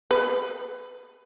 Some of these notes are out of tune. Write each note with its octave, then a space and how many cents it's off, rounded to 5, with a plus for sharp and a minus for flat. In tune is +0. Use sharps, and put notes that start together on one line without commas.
B4 +15